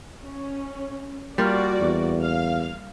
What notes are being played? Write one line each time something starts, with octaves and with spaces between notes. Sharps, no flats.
C#4
G3 A#3 F4 F#4 D5
E2
F5